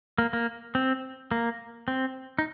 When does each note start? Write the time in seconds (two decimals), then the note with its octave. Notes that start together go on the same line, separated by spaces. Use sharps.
0.18 A#3
0.33 A#3
0.75 C4
1.31 A#3
1.88 C4
2.39 D#4